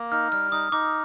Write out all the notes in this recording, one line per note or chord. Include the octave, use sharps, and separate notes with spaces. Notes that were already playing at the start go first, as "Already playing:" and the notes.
Already playing: A#3
D#4 F6
G3 F6
D#4 D#6
D#4 D6